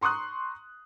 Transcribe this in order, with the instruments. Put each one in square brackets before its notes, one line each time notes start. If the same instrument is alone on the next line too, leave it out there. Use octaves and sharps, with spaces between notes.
[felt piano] A#5 C6 C#6 D#6 F#6